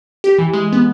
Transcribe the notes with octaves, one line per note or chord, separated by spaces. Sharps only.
G4
E3
G#3
B3